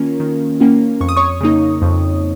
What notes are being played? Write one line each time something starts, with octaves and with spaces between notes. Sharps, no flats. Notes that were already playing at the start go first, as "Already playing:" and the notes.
Already playing: D#3 A#3 C#4 F4 A#4
D#3
A#3 C#4 F4
F2 C#6
D#6
C#5 C#6
C#3 A#3 D#4
F2